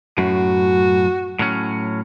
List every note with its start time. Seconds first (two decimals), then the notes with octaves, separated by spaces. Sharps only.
0.18 F#2 A2 F#4
1.39 A2 F#3 C#4